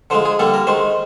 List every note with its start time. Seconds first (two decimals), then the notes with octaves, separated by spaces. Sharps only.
0.10 D3 F3 G#3 C5
0.25 G#4
0.39 D3 G3 A#3 A4
0.54 A#4
0.67 D#3 G#3 C5